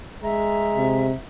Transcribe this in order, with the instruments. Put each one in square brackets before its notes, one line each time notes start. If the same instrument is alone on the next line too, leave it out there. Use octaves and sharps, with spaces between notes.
[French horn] G#3 [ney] E5 [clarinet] A#5
[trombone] C3